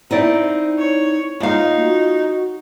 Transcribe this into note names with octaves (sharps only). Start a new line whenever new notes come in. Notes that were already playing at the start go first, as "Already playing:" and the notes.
C4 D#4 E4 D5
C#5
A#3 D#4 F4 F5
F#4